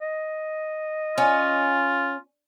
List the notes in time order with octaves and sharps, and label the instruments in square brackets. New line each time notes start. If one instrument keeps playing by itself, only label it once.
[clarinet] D#5
[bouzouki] C#4 [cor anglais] F4